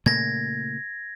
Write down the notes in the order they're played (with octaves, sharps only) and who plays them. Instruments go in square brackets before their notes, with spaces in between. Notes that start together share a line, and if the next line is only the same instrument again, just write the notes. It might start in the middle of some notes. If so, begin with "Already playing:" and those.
[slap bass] A#2 C#3 A3 [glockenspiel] G#6 A#6